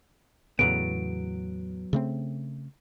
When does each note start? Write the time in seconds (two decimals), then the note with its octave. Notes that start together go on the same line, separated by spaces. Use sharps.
0.59 E2 A2 C#3 F#3 B3 D7
1.93 C#3 A3 C4